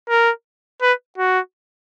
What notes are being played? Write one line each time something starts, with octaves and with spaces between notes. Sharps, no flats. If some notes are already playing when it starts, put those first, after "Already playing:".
A#4
B4
F#4